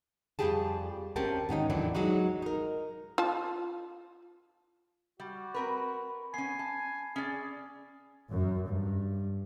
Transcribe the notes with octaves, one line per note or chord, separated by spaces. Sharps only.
F2 D#3 G3 G4 G#4 A5
D2 C4 C#4 G4 A#4 A5
G#2 D#3 C#4 D#4
E2 A2 D#3 E3 F#3 D4
F#3 G#3 D#4 F#4
D#4 A#4
F4 A5
G3 F#4
C4 A#4 B4 B5
B3 C#4 G#5 C7
A5
C#4 G#4 D5
F#2
G2